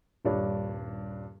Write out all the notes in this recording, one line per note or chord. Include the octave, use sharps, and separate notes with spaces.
D#1 G2 D4 C#5